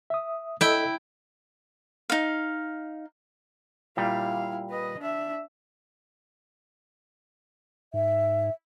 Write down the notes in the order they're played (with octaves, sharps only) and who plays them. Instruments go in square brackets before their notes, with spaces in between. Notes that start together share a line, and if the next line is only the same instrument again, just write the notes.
[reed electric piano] E5 D#6
[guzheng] E4 G5 [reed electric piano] A4 D#5 E6
[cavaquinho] D#4 F5
[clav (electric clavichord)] A#2 G3 [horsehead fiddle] E4 F5
[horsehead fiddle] B4 D#5
D4 E5
[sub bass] G#2 [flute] E5